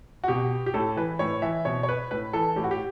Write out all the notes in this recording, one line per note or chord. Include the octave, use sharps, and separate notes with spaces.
F#4
B2 G4
G4
A2 A4
E3 B4
A2 C#5
E3 E5
B2 C#5
C#5
B4
A2 B4
E3 A4
A2 G4
F#4
G4